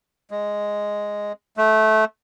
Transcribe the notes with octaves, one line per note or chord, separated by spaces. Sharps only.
G#3
A3